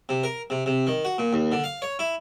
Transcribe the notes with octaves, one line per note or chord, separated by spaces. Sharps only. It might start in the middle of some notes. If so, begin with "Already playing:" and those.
C3
A#4
C3
C3
D#3
F#4
A#2
D#2
D3
F5
C#5
E4